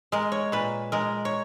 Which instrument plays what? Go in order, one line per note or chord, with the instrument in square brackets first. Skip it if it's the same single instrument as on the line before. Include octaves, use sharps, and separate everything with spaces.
[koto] G#3 A#4
C#5
A#2 B4
G#3 A#4
C#5